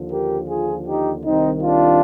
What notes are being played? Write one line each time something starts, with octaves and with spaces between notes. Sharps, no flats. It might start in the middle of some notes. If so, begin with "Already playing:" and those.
Already playing: D#2 D3 F3
G4 A#4
F4 G#4
D#4 G4
C2 C3 D#3 C4 D#4
D4 F4